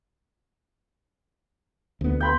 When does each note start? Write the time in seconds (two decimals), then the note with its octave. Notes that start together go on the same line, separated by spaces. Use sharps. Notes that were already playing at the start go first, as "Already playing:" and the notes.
2.01 D2 B3
2.20 G5 B5 C6